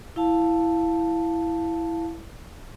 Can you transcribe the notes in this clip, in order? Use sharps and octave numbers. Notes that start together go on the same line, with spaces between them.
E4 F5 A5